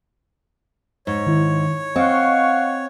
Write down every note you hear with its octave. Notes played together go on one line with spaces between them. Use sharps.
G#2 C#5
D#3 E4
C4 D#5 F5 F#5 C#6